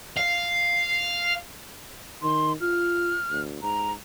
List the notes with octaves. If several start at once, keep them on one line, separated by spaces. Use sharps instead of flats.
F5
D#3 C6
F4 F6
D2
G#2 A#5